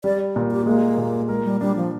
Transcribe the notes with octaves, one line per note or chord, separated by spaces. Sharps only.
G3 D5
A#2
G4
G#3 A#3
A#2
G#3 A#4
G3
G3 D4
F3